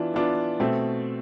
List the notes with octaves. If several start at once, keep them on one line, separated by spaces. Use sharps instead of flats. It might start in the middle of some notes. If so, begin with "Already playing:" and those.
Already playing: E3 B3 D4 F4
E3 B3 D4 F4
B2 A3 C4